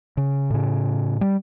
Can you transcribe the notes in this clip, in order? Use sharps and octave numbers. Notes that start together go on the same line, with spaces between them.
C#3
A2 C#3
G3